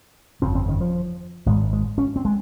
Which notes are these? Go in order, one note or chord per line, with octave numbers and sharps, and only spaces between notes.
G1 F2 C#3 C4
C4
D#3
F3
G#1 G#2 G#3
G#3
C#4
C4
G#3